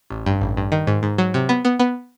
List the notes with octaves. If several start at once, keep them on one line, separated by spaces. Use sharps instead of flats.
A1
G2
A1
G2
D#3
G#2
G#2
F#3
C3
B3
B3
B3